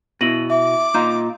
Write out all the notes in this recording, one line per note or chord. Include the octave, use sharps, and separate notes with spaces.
B2 E4 A#6 D#7 F#7
E5 D6
A#2 D#4 F4 A#5 G6